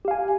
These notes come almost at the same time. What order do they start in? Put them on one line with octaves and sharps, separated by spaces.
G4 F5 G#5